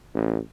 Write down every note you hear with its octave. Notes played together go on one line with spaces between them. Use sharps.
A1